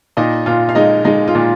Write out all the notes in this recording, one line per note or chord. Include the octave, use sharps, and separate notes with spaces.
A#2 D#4 D#5
A#2 F4 F5
F5
G#3 D#4 D#5
G#3 D#4 D#5
F4
A#2